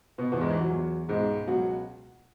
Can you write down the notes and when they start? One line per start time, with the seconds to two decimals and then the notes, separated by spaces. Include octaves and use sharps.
0.18 B2 B3
0.32 E2 B2 E3 B3
0.41 G#2 G#3
0.51 E3
0.61 F#3
0.70 E2 E3
1.08 C#2 G#2 B2 G#3
1.47 C#2 B2 F#3 F#4